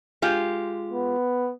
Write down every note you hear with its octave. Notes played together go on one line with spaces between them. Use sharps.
G#3 F4 G4
B3